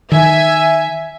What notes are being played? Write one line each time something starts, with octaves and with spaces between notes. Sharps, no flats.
D#3 E5 G#5